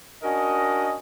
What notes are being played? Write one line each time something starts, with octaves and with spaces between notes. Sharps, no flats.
C#4 D4 F#4 A#4 D#5